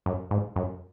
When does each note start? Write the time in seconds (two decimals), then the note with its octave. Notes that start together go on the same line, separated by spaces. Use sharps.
0.06 F#2
0.31 G#2
0.56 F#2